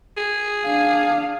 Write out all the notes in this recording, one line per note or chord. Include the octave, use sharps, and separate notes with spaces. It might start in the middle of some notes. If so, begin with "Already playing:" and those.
G#4
D4 F5